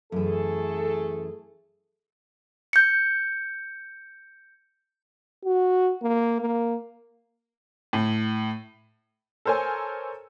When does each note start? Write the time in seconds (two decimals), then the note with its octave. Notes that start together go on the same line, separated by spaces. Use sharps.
0.12 F#2 E3 A3 G#4 A4
2.73 G6 C#7
5.45 F#4
6.03 A#3
6.41 A#3
7.93 A2
9.45 A4 A#4 C5 C#5 G#5